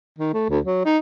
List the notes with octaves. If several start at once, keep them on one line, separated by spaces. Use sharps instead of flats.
D#3
A3
D2
F#3
D#4